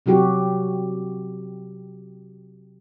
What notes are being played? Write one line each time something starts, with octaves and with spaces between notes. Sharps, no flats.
C3 F#3 F#4 G4